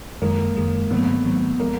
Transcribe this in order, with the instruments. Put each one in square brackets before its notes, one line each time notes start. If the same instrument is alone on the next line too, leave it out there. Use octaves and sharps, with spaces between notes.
[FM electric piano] F#2 D#3 G#3 [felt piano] A#3
[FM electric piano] F#2 D#3 G#3
[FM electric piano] G#2 D#3 F#3 A3 C4 [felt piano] B3
[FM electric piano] G#2 D#3 F#3 A3 C4
[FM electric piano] F3 G#3 [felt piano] A#3